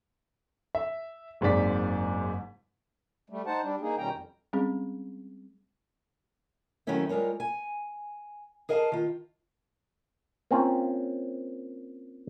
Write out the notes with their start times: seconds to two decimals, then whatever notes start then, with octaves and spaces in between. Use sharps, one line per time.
0.75 E5
1.41 F#1 G#2 C4 D5 B6
3.30 G3 A3
3.46 D#4 C5 F#5 A5
3.62 G3 D4
3.81 A#3 D#4 G#4
3.98 B2 D#3 G3 C#4 G5 A#5
4.10 F2
4.53 G3 G#3 C4 C#4 G#4
6.87 D#3 F#3 A3 C4 C#4 E4
7.09 G3 G#3 F4 A#4 C#5
7.40 G#5
8.69 G#4 A#4 D#5 F5 G5 A5
8.92 D#3 F4
10.51 A#3 C4 C#4 F4